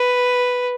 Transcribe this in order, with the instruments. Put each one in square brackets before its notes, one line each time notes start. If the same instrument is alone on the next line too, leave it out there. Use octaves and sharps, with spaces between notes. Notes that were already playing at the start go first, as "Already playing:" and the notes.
Already playing: [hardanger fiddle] B4